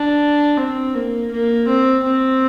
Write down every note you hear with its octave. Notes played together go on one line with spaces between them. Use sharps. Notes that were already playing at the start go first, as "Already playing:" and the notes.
Already playing: D4
C4
A#3
A#3
C4
C4